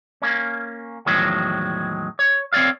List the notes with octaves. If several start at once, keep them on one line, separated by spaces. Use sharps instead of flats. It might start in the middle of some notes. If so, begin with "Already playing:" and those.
A#3 C#4
E2 A2 D#3 F3 F#3 G#3
C#5
C4 C#5 D5 F5